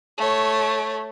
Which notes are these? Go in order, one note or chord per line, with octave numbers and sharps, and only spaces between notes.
A3 C#5